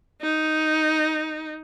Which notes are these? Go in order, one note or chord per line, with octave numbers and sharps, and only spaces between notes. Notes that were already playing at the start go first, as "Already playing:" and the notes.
D#4